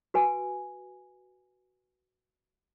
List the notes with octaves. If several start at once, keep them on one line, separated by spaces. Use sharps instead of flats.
F#4 B4 G#5